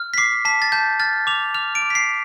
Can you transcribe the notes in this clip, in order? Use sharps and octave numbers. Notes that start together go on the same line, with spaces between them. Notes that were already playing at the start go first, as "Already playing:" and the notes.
Already playing: F6
B6
D6 C7
A5 B6
A6
A5 G6
F6 A6
D6 F7
F6 F7
D7
D6
B6
C7